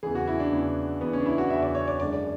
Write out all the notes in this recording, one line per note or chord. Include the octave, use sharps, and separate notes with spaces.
E2 C#3 E3 G#4
F#4
E4
D4
E2 C#3 E3
E2 C#3 E3 B3
C#4
D4
E4
F#4
E2 C#3 E3 E5
D5
C#5
D5
F#2 D3 G#3 D5